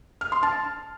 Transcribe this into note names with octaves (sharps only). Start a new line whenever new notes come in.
F6
C6
A5